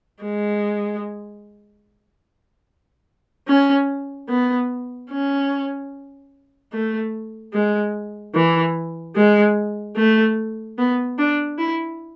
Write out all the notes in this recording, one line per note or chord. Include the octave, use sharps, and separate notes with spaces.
G#3
C#4
B3
C#4
A3
G#3
E3
G#3
A3
B3
D4
E4